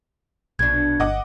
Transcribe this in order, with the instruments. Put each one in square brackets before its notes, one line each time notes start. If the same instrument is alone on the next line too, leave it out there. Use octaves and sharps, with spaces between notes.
[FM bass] A#1 [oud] B2 D4 [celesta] G#6
[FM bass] G1 [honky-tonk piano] D#5 F#5 D6